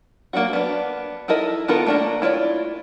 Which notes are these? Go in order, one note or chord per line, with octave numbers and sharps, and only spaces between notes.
F#3 A#3 C4 D4 F#4
B3 D4
D#4 E4 A4 A#4 D#5
D#3 B3 F4 A4 A#4
A3 A#3 D4 G#4 A#4
E4 F4 C#5 D5